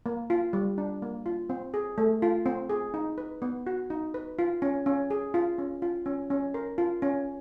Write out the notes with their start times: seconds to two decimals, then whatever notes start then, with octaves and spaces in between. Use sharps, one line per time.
0.06 A#3
0.30 F4
0.53 G3
0.78 D4
1.02 A#3
1.26 F4
1.50 C4
1.74 G#4
1.98 A3
2.22 F4
2.46 C4
2.70 G#4
2.94 D#4
3.18 B4
3.42 B3
3.66 F#4
3.90 D#4
4.14 B4
4.39 F4
4.62 C#4
4.86 C#4
5.11 G#4
5.34 F4
5.58 C#4
5.82 F4
6.06 C#4
6.30 C#4
6.54 A#4
6.78 F4
7.02 C#4